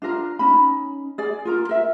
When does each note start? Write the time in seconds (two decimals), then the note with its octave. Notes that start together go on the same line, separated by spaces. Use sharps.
0.02 D4 F4 A#4 A#5
0.39 C#4 D#4 B5
1.18 G#4 D5
1.45 F4 A#4 A#5
1.69 A#4 E5